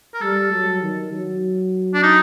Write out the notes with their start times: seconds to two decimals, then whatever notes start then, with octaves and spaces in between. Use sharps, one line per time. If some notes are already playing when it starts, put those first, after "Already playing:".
0.14 A#4
0.22 G3 A4
0.52 F#3
0.82 D#3
1.12 F#3
1.94 D4
2.03 D#4